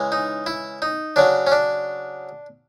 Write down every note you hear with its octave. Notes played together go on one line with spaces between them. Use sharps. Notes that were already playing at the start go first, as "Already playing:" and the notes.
Already playing: C#3 E3 G#3
D#4
E4
D#4
C#3 F#3 D4
C#4
D4